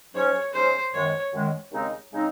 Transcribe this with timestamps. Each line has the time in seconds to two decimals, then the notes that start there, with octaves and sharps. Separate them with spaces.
0.14 G#2 F#3 C#4 C#5
0.53 G#2 F#3 C#4 C5
0.93 F#2 D#3 G#3 C#5
1.33 F#2 D#3 G#3
1.71 D#2 C#3 G#3 C4 D#4
2.13 C#3 G#3 C4 D#4